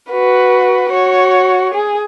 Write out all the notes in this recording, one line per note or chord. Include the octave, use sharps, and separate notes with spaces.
F#4 B4
F#4 C#5
G#4